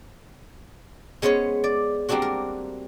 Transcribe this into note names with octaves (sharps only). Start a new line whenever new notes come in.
G#3 B3 C#4 C5 C#5
D5
G3 A#3 C4 D4 F#4
A#4